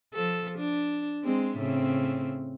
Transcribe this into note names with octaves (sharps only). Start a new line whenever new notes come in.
F3 A4
D4
G#3 C4
A2 C#3 C4